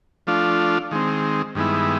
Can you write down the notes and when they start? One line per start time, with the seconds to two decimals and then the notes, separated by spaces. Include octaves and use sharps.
0.27 F3 A3 D4 F4
0.91 D#3 G#3 C4
1.55 G2 D#3 G#3 B3 E4